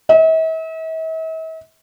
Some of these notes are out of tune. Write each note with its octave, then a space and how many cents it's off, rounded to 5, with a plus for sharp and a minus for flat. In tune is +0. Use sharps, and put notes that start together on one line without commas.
E5 -45